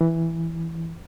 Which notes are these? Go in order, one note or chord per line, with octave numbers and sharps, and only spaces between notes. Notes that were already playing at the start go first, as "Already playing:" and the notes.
E3